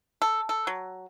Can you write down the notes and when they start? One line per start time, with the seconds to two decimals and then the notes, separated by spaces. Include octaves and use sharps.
0.22 A4
0.49 A4
0.67 F#3